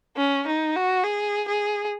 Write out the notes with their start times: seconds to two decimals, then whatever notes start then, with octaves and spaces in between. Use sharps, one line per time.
0.17 C#4
0.47 D#4
0.76 F#4
1.04 G#4
1.48 G#4